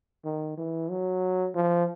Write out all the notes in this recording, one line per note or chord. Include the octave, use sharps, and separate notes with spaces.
D#3
E3
F#3
F3